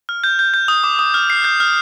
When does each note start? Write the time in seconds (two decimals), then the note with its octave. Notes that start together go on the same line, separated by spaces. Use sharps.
0.09 F6
0.24 G6
0.39 G6
0.54 G6
0.68 D#6
0.84 D6
0.99 D#6
1.14 F6
1.30 C7
1.44 G6
1.60 F6